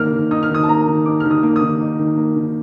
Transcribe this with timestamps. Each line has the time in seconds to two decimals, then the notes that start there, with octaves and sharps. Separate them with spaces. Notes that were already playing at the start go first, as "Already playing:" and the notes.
Already playing: D#3 A#3 F6
0.12 D#3
0.31 D#4 D#6
0.43 F6
0.50 D#3 D#6
0.63 A5
0.69 A#3 A#5
0.87 D#3
1.06 D#4 D6
1.20 D#3 F6
1.31 D#6
1.43 A#3
1.56 D#6
1.62 D#3
1.81 D#4
1.99 D#3
2.18 A#3
2.36 D#3